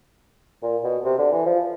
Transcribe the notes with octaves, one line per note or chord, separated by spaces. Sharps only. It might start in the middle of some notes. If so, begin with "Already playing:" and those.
A#2
B2
C3
D3
E3
F3